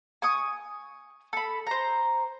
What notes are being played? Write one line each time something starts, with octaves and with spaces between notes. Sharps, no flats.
G#5 C#6 D#6
A4 B5
C5 A#5